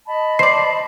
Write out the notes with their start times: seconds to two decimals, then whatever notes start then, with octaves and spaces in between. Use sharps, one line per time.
0.07 D#5 A5 B5
0.39 C5 D5 C7